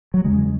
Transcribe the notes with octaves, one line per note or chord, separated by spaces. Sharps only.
F#3
E2 C#3 G#3